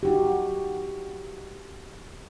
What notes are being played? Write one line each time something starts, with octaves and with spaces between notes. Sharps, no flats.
D#4 F#4 G4